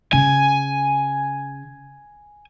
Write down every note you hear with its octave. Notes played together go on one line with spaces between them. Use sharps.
C#3 G#5